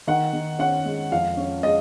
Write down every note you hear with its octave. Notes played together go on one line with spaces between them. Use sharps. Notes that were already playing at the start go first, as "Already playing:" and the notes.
D#3 F#5
D#3
C#4 F#5
G#3
F2 F5
C#4
G#3 D#5